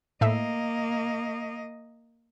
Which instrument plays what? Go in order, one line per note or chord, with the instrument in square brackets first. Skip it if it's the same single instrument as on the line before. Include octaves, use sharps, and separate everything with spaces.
[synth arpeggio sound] A2 E5 [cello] A#3 D#5